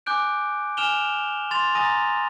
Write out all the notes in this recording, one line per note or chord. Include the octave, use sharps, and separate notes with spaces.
G#5 D6 F#6 G6 D7
G#5 F6 E7 F7 G7
C6 A6 F7
G#5 A#5 D#6 A6 A#6 D#7